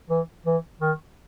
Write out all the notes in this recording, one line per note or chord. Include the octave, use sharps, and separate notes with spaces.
E3
E3
D#3